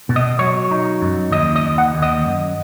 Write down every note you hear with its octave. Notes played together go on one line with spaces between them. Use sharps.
B2
D#5
F#3 C#5
D#4
F#2
D#2 D#5
D#5
D#2
F#5
D#2
D#5
F#2